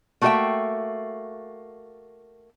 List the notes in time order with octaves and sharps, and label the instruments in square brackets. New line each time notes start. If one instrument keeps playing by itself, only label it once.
[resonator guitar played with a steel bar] A3 A#3 F#4 G#4 E5 G5